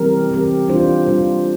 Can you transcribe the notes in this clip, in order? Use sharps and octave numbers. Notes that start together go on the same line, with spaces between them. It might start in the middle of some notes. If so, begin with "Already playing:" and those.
Already playing: E3 G3 C4 G4 A#4
E3 G3 C4 G4 A#4
E3 G3 D4 F4 C5
E3 G3 D4 F4 C5